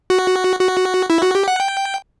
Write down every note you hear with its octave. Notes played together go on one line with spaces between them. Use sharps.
F#4
F#4
E4
F#4
G4
F#5
G5